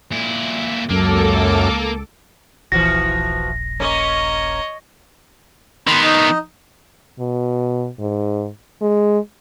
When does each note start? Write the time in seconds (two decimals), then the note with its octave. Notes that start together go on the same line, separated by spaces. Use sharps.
0.12 A#2 E4
0.91 C#2 F#2 A#3 A4 D6
2.72 D#1 A#1 E3 F3 F#4 A#6
3.80 A#3 C#4 C#5 D#5
5.87 D#3 B3 B5 C6
6.04 D#4 D#5
7.20 B2
7.99 G#2
8.82 G#3